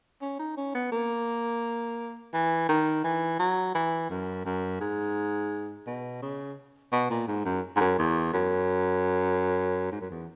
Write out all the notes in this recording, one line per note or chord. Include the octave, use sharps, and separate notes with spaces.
C#4
D#4
C#4
B3
A#3
E3
D#3
E3
F#3
E3
F#2
F#2
G#2
B2
C#3
B2
A#2
G#2
F#2
G#2
F#2
E2
F#2
G#2
F#2
E2